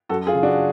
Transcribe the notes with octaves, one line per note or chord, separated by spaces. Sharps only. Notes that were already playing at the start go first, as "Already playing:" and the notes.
F#2 F#4 A4
F4 G#4
C#3
D4 F#4